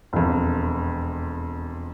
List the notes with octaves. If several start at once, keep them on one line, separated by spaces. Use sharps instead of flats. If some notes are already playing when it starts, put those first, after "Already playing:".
E1 F2